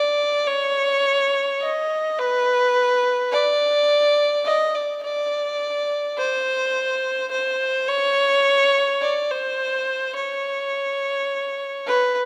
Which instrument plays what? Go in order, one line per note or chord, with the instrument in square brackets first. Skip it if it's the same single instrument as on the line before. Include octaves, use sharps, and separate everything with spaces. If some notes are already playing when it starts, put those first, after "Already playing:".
Already playing: [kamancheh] D5
C#5
D#5
B4
D5
D#5
D5
D5
C5
C5
C#5
D5
C5
C#5
B4